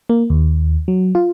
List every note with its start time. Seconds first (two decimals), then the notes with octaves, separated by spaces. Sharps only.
0.10 A#3
0.30 D#2
0.88 F#3
1.15 F4